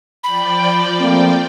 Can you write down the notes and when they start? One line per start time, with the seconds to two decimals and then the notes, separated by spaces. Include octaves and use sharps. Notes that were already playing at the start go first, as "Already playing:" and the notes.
0.24 F3 D5 G5 B5
1.00 A3 A#3 C4